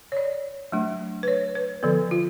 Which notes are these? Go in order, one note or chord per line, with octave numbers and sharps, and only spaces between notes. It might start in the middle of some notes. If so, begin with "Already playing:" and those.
C#5
D5
F#3 A3 D4
B4
C#5
B4
D3 F3 B3 A4
F4